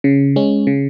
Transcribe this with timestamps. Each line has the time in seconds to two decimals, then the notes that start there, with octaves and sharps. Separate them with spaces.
0.04 C#3
0.36 G#3 C#4
0.67 C#3